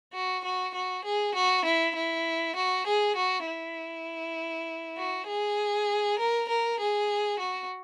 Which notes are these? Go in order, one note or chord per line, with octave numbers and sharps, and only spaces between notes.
F#4
F#4
F#4
G#4
F#4
E4
E4
F#4
G#4
F#4
E4
F#4
G#4
A#4
A#4
G#4
F#4